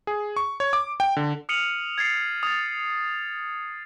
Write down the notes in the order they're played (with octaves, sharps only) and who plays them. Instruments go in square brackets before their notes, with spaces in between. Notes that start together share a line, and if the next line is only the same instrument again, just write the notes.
[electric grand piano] G#4
C#6
C#5
D6
G5
D3
[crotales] D#6 F6 C#7 D#7 F7 F#7
G#6 A6 C7 C#7
D#6 A6